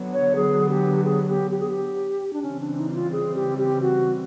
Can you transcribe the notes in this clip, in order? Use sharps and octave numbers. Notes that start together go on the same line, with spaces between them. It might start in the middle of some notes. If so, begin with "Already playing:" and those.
Already playing: D3 F#3 B3
C#5
G#4
G4
G#4
G#4
G4
G4
G#4
G4
D4
C#3 E3 G3 C4 C#4
D4
D#4
E4
F4
G#4
G4
G4
F#4